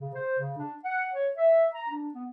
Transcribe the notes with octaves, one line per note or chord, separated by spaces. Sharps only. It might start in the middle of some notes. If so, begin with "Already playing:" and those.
C#3
C5
C#3
D4
F#5
C#5
E5
A#5
D4
B3